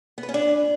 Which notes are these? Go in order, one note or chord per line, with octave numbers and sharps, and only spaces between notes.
B3
B4
C#4
D4